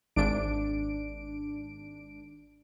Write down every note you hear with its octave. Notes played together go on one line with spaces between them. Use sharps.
G#1 D4 D7